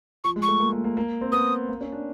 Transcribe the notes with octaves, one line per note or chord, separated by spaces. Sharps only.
F3 C#6
G#3
C#6
A3
A#3
A#3
A#3
A#3
C4
B3 D#6
A#3
C#4
D4